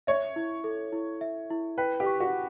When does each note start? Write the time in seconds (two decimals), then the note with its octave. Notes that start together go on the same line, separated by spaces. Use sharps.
0.07 C#5 E5
0.36 E4
0.64 A4
0.92 E4
1.21 E5
1.50 E4
1.78 B4 G5
2.00 G4
2.06 C#6
2.20 F#4